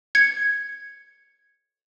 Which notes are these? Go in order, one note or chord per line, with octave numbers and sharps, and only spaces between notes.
G#6 C#7